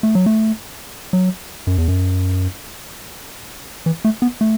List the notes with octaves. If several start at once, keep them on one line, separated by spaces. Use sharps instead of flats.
A3
F#3
A3
F#3
F#2
E2
F#2
E3
A3
B3
A3